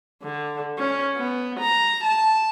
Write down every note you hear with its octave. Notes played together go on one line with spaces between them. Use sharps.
D3
C#4
B3
A#5
A5